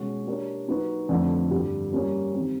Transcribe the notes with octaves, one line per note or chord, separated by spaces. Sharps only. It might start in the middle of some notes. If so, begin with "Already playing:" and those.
Already playing: B2 G#3 C#4 F#4
A#3 D4 G4 A#4 C#5
F#3 A#3 D#4 F#4 B4
F2 D3 F3 A3
G2 D3 G3
G3 A#3 C#4
D#3 G3 C4